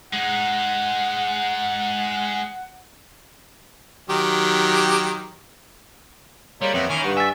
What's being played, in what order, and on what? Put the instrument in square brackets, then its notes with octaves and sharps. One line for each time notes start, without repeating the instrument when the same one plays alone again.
[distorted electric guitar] G#3 D#4 [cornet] F#5
[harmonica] D#3 F#3 G4
[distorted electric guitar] G3 [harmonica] G#3 D#4 F4 [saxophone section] A#3 C5 C#5
[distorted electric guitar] F2 [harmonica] B3 G4 E5
[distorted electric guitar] D#3 [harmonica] E3 C#4 F6
[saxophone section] G2 [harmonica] F#5 C#6
[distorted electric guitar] E5 [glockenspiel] G#5 A6